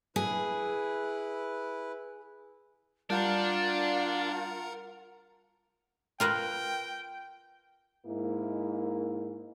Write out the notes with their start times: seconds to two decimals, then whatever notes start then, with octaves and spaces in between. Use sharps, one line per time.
0.16 E4 G#4 B4
3.10 G3 D4 F4 A#4 F#5 A#5 G6
6.20 F4 A#4 B4 G5
8.06 G#2 A#3 E4